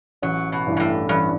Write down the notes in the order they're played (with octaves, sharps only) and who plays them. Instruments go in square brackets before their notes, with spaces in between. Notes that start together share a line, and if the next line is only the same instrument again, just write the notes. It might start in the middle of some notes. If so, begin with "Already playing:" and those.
[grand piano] A1 [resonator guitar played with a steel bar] F#3
[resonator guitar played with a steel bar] B2
[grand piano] G2 E3
[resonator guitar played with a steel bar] B2
A2
[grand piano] A1 [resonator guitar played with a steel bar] G2